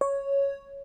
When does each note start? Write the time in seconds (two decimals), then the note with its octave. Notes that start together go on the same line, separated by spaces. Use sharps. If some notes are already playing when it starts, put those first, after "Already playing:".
0.01 C#5